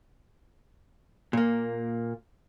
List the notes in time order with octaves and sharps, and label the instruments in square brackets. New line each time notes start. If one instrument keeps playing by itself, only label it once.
[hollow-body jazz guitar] A#2 A#3